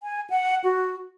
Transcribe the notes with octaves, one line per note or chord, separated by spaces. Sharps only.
G#5
F#5
F#4